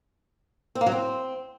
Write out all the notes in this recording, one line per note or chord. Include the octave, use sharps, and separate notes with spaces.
C4
A#3
F#3
C4